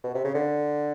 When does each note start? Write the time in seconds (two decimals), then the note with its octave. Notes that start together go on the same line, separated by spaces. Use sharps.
0.04 B2
0.15 C3
0.25 C#3
0.35 D3